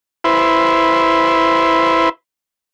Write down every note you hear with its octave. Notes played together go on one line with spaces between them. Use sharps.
E4 B4 C5